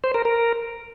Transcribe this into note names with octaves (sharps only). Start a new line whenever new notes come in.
C5
A#4
A#4